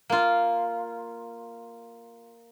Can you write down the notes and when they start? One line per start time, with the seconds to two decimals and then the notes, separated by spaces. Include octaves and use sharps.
0.10 A#3 F4